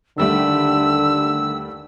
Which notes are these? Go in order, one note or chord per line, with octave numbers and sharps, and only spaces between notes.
D#2 D3 G3 A3 E6